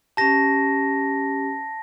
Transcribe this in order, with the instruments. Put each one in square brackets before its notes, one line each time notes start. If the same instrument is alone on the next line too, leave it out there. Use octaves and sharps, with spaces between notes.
[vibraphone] C#4 G4 [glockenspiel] A5 A#6